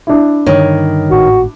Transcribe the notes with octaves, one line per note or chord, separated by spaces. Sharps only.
D4 E4
G2 D3 D#3 C#5
G#1 A2 F#4